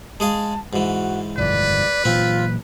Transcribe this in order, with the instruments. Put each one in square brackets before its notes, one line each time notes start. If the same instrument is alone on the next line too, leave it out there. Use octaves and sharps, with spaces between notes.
[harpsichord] G#3 G#4 F5 [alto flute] A5
[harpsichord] G#2 E3 [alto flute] F#4
[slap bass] G1 F2 B2 [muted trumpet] B4 [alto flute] D5
[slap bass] A#2 E3 F#3 [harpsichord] C4 [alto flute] F4